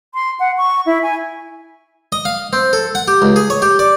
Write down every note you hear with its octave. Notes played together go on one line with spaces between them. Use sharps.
C6
F#5
C#6
E4
G#5
D#5
F5
C4
A4
F#5
G4
C#2
G#4
C#5
G4
D5